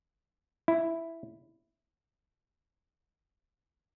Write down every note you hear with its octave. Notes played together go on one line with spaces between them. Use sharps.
E4